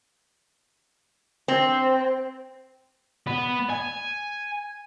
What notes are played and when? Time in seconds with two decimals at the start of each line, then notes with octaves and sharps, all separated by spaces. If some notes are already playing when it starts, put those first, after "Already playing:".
1.48 C4
3.27 B3
3.70 G#5